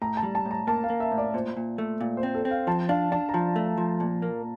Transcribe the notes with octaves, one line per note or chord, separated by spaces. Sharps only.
A2 A#5
A5
G3
A5
A2
A#5
A#3 A5
F5
A#3
E5
A2
D5
A#2 C5
A#2
A3
A#2
C5
C4
A4
C4
F5
F3 A5
D4 F5
D4 A5
A#5
F3 A5
A3
F3
A#2
A#3